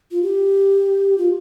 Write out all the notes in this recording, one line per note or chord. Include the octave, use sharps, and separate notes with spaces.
F4
G4
F4